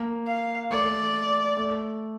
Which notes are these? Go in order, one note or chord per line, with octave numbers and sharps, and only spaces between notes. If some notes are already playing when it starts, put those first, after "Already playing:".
Already playing: A#3
F5
A3 D5
A3